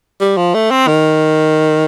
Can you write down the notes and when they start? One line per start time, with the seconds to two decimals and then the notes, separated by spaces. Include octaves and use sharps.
0.21 G3
0.37 F3
0.54 A3
0.71 C4
0.88 D#3